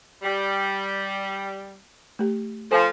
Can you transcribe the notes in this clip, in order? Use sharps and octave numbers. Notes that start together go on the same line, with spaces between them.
G3
A3 G4
F3 A4 C5 G#5